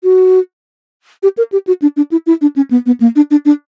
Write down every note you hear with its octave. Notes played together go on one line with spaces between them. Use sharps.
F#4
G4
A#4
G4
F#4
D4
D4
E4
E4
D4
C#4
B3
B3
A#3
D4
D4
D4